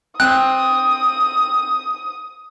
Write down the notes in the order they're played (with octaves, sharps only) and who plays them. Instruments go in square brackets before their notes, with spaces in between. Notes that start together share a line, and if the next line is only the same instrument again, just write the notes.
[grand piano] C4 [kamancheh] D#6 [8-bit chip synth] F#6